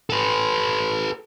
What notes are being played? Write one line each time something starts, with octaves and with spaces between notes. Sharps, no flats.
A4 B4